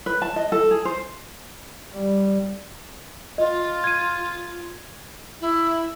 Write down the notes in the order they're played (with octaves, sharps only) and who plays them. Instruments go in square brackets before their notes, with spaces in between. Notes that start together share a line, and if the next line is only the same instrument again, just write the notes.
[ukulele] B4
A5
D#5
A4
G#4
C5
[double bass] G3
[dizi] F4 [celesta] D#5
[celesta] G#6 D#7
[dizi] E4